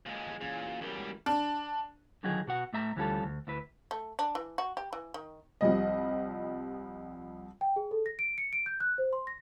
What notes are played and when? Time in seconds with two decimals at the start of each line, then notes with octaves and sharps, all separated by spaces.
0.06 A#2 G#3
0.27 E3 G#4
0.41 A#2 E3 C#4 G#4
0.64 A#3 F#4 G#4
0.81 E2 E3 G3 C#4 A#4
0.98 G#3 E4
1.26 D4
2.23 D3 D#3 F#3 D#4 F4 G#4
2.47 B2 F#4 F#5
2.73 A2 A3 E5 A#5
2.96 D2 E3 G3 C#4 F4 A4
3.23 D2
3.47 D2 E4 B4
3.91 A3
4.19 D4
4.35 E3
4.58 F#4
4.77 G4
4.93 E3
5.14 D#3
5.61 C2 F3 G3 D#5
7.61 G5
7.76 G#4
7.91 A4
8.06 A#6
8.19 D7
8.38 C#7
8.53 D7
8.66 G6
8.80 F#6
8.98 C5
9.13 C6
9.27 A#6